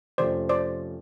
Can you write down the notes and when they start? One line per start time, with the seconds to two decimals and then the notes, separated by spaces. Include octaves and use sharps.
0.18 F2 C3 F3 A3 C#4 C5 D5
0.49 C5 D5